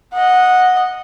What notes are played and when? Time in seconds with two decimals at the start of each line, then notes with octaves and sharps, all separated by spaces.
0.14 D#5 F#5